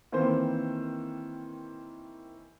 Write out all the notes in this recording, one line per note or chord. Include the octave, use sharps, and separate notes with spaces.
D#3 E3 A#3 C4 C5